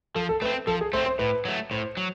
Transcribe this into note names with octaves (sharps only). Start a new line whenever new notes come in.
F3 A4
A4
A3 C4 B4
F3 A4
G#4
A3 C4 C5
C5
A2 B4
F#3 A3
A2 C5
F#3